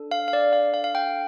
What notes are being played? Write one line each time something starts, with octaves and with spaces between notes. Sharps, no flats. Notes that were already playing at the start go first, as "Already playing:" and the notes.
Already playing: D4 A4
F5
F5
D5
F5
F5
F5
G5